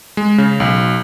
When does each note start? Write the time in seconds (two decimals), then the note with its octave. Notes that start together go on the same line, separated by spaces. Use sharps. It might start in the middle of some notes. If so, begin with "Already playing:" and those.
0.17 G#3
0.38 C#3
0.60 B1